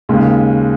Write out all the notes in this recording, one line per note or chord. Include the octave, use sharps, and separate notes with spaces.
D#2 C#3 G#3